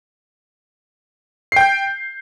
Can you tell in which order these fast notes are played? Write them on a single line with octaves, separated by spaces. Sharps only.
C7 G5 G6